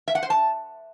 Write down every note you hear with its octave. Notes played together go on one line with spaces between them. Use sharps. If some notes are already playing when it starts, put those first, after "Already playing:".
E5
F#5
C5
A5